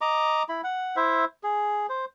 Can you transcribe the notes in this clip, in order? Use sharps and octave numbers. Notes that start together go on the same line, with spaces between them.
D#5 A#5 D6
E4 B5
F#5
E4 C5 E5
G#4
C5